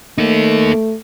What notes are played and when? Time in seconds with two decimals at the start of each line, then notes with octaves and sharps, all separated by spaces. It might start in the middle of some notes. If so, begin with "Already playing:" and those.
0.18 A3 A#3 D#4